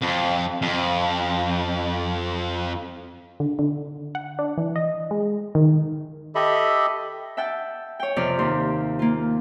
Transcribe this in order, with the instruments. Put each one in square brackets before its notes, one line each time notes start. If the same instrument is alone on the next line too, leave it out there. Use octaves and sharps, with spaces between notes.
[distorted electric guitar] F2
F2
[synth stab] D3
D3
F#5
D4
E3
D#5
G#3
D#3
[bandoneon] G4 A4 D#5 E5 B5
[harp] E5 F#5 G5 A5
C#5 G5
F2 C3 D5 F6
D#2 C6
A#3 F4